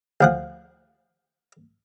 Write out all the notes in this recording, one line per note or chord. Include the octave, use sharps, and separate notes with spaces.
D2 F3 F#5